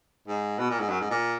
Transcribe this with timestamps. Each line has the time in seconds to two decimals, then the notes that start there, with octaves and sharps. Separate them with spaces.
0.28 G#2
0.59 B2
0.70 A#2
0.80 G#2
0.90 F#2
1.01 G#2
1.10 A#2